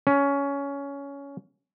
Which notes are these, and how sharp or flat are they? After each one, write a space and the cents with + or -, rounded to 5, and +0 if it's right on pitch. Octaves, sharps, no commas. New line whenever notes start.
C#4 +15